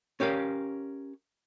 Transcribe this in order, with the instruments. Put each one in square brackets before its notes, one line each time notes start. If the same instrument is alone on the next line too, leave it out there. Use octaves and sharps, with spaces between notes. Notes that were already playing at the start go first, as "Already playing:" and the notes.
[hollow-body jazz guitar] C#4 G4 A#4 F5